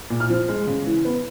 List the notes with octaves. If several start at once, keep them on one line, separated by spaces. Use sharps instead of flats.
A#2
F6
F3
G#3
C#3
E3
B3